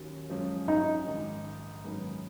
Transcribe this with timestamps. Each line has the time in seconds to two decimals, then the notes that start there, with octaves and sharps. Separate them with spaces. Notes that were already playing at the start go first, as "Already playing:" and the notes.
Already playing: D#2 D#3 F#3 C#4
0.30 F#2 F3 G#3 C#4
0.68 D#4
1.07 A#1 G#2 D#3
1.84 F#2 D#3 G#3 B3